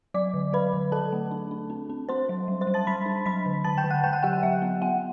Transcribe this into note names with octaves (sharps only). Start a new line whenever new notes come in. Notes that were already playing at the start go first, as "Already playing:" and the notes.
F#3 D5 D6
D3
F#3 B4 B5
D3
F#3 A4 A5
A3
D4
D4
C4
C4
C4 C5 C6
F#3
G3
C5 C6
G3
A5 A6
G3 B5 B6
D4
F#3 B5 B6
D3
D3 A5 A6
G5 G6
D3
F#5 F#6
D3 G5 G6
F#5 F#6
F#3 G4 G5
F#5
F#3 E5
B3
B3 F#5